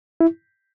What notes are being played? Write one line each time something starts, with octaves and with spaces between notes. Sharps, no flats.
E4